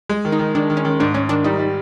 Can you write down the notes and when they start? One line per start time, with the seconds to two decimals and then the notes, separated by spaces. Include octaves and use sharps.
0.09 G#3
0.25 D#3
0.32 D#4
0.39 D#3
0.55 D#3 D4
0.70 D#3
0.77 C#4
0.85 D#3
1.00 G#2 D4
1.14 G#2 C#4
1.29 D#3 D4
1.44 G3 D#4
1.59 G3